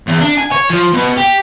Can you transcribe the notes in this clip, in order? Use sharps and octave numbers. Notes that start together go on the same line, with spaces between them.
E2
D4
G#5
C#5
F3
B2
G4